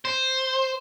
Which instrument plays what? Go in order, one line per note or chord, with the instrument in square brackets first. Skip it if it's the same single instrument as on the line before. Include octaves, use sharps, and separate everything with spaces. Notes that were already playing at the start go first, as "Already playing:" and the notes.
[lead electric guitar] C5